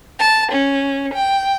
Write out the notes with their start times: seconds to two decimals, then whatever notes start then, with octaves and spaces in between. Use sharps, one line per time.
0.18 A5
0.52 C#4
1.13 G5